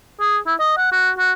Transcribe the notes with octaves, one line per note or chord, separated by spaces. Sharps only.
G#4
E4
D#5
F#5
F#4
F#4